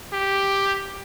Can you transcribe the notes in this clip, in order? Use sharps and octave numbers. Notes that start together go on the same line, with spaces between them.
G4